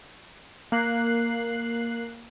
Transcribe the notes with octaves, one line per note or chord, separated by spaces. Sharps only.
A#3 F#6 C7